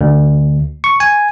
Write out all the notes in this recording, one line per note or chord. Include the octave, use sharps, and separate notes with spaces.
D2
C#6
G#5